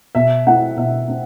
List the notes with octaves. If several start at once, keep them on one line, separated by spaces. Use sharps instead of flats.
B2 E5
A3 C4 E4 F#5
B2 E5
A3 C4